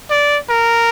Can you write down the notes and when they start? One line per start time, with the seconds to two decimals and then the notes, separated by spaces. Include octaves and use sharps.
0.10 D5
0.50 A#4